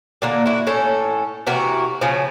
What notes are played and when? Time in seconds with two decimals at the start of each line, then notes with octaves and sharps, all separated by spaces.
0.22 A#2 D3 A#3
0.46 E4 F#4
0.67 A2 C#4 A4
1.47 C3 E3 F#4 A#4
2.01 C#3 F3